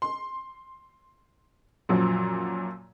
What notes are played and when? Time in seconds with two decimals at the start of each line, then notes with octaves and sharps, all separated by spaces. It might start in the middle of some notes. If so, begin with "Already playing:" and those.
0.02 C6
1.89 F#2 A#2 F3 F#3